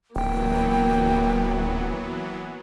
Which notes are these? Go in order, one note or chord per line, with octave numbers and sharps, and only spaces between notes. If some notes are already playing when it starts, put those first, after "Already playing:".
D1 E3 F#3 A#3 B3 G5